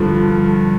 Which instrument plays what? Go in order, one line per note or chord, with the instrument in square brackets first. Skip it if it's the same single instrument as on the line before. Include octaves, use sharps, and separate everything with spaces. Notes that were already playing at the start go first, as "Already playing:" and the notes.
Already playing: [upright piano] G2 D3 F3